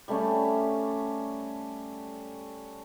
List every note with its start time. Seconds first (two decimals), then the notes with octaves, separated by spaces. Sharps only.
0.08 G3 A3 C#4